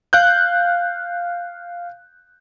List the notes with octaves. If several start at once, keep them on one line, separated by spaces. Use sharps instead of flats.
F5 F#6 G6